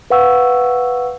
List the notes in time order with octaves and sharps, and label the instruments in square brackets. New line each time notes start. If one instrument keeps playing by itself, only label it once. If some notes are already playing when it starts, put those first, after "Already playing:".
[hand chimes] B4 F5 F#5 C#6 E6